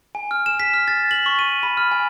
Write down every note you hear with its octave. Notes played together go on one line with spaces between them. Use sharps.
G#5
F6
E7
B6
F6
A6
F#7
C#6
D#7
B5
F6
G#5